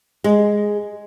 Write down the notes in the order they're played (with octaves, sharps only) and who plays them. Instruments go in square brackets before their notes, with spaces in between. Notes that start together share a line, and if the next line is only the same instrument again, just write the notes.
[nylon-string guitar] G#3